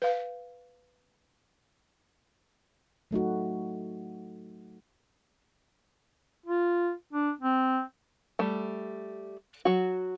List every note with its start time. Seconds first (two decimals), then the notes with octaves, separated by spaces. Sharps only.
0.02 B4 F5
3.11 F#3 A3 D#4 F#4
6.46 F4
7.13 D4
7.41 C4
8.39 G3 A3
9.65 F#3 F#4